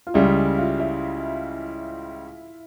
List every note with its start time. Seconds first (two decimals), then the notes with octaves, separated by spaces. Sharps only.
0.07 F4
0.14 C#2 C#3 G3 E4
0.58 F4
0.80 E4